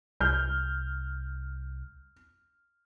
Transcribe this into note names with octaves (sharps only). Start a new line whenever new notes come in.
C2 F6 G6